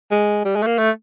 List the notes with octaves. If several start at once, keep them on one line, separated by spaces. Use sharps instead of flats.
G#3
G3
G#3
A3
A#3
A3